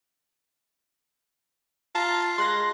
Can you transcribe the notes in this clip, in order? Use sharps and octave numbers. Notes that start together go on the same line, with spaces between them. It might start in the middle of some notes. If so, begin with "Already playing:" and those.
F4 A5 A#5
G#3 C6 F#6 A#6